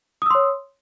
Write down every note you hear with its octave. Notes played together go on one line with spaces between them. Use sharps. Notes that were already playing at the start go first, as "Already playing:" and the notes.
C#5 C6 D#6 E6